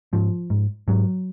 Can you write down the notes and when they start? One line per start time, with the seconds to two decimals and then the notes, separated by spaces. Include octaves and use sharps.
0.13 G#2 F3
0.50 G#2
0.88 G#2 F#3